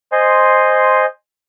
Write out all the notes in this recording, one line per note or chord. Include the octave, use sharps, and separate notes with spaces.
C5 D#5 G#5 C6